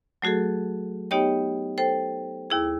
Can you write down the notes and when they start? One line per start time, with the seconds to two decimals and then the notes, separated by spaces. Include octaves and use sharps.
0.22 F#3 A3 F#4 G#4 A4
1.11 B3 D#4 G4 C#5 D#5 G5
1.78 A4 C5 G5
2.50 D#2 E4 G#4